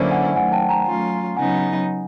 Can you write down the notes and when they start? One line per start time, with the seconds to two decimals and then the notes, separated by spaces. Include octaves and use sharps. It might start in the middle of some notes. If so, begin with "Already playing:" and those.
Already playing: D3 F#3 A#3 C#4 E4 C5 D5
0.11 F#5 G#5
0.36 D#3 F#3 A3 F#5 G#5
0.52 G5 A5
0.69 G#5 A#5
0.86 F#3 A3 C#4 F4
1.36 C#3 F#3 B3 D#4 F#5 G#5